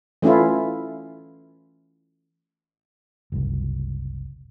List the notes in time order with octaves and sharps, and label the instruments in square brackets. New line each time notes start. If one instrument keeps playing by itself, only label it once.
[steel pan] E3 A3 C#4 E4 F4
[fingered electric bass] F#1 C2